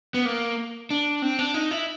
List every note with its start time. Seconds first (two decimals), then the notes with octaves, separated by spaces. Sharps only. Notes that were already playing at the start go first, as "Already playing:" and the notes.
0.14 B3
0.25 A#3
0.91 D4
1.22 C4
1.39 D4
1.54 D#4
1.71 E4